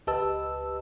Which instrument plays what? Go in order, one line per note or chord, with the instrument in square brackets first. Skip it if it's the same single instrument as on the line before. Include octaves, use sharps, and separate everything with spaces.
[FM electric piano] C#2 G4 B4 D#5 A5 E6